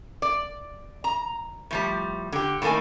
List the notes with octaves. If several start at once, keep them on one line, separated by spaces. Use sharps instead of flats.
D5
A#5
A2 F3 G3
D3 G4
A2 D#3 A#3 A4 G#5